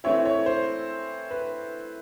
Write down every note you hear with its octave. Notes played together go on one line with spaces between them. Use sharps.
E3 A3 C4 E4 C#5
C#5
C5
B4